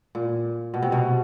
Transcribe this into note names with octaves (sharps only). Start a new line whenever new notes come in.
A#2
B2
C3
B2